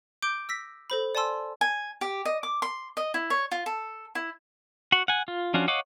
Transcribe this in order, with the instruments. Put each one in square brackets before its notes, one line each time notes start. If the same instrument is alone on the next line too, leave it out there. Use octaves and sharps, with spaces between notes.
[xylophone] D6 G6 D7 G7
E6 A#6 B6
A4 C5 B5
D5 G#5 A5 C6 E6
[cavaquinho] G#5
G4
D#5
D6
C6
D#5
E4
C#5
F4
A4
E4
[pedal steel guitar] F#4 F#5
F#5 G#5
F4
F3 C#4 D4 F4 F#4
C#5 D#5 F5 F#5 D6